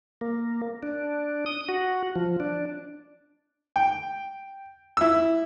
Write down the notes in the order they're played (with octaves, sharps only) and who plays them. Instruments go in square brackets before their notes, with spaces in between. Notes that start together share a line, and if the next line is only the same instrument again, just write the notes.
[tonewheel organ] A#3
D4
D#6
F#4
F3
D4
[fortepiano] G5
E4 E6